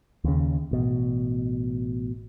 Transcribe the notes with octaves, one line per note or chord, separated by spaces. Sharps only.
D#2 C#3
A1 B2